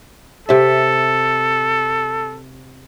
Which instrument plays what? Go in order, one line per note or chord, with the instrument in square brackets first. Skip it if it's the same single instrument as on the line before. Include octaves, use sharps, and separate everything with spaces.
[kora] C3 E5 [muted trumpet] A4